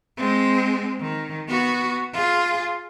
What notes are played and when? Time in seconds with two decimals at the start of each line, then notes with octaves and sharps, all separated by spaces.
0.17 G#3 C4
1.01 D#3
1.48 B3 F#4
2.13 F4 G#4